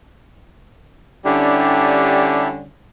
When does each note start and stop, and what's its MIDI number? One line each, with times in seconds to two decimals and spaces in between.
1.25 2.67 50
1.25 2.67 55
1.25 2.67 61
1.25 2.48 62
1.25 2.48 64
1.25 2.48 67